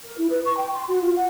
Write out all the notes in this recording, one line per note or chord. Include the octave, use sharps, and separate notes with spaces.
A#4
E4
B4
C#6
G5
C6
F#4
F4
F#5